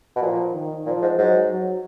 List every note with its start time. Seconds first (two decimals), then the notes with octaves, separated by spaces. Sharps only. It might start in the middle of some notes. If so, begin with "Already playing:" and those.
0.16 B2
0.22 A#2 F3
0.54 D#3
0.86 A#2 F3
1.02 G#2
1.17 G#2 F#3
1.49 F#3